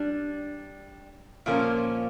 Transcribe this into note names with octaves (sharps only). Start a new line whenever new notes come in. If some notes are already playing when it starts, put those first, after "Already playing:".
Already playing: G3 D4
A#2 F3 A#3 C#4